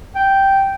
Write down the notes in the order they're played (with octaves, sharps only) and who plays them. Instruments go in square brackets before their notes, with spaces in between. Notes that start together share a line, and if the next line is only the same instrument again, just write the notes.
[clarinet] G5